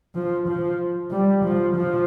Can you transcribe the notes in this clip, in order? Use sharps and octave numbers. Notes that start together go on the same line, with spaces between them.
F3
F3
G3
F3
F3